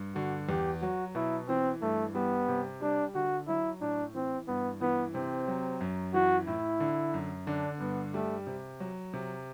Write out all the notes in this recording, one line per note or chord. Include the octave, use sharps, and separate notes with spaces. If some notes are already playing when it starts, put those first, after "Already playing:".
Already playing: G2
D3 F#4
E2 G4
F#3 F#4
B2 E4
E3 C4
G2 A3
G3 B3
C3
G3 D4
D3 F#4
F#3 E4
A2 D4
E3 C4
G2 B3
E3 B3
C3 C4
F#3
F#2
E3 F#4
A2 E4
D3
F#2
D3 D4
G2 B3
G3 A3
C3
F#3
C3